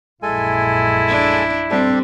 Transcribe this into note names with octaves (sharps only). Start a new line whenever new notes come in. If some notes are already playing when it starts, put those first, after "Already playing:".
A#1 F#2 G#3 E4 A4 G#5
D4
G3 C4 D4 G4 A4